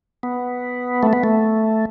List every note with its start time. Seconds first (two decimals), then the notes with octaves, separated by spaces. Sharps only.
0.23 B3
1.03 A3
1.13 B3
1.24 A3